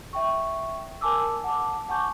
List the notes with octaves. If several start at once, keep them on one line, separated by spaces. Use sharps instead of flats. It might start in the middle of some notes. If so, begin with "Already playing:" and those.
E5 G5 C#6
A#4 G#5 A5 D6 E6
F#5 A5 D6
F#5 G#5 A5 C#6 D6 G6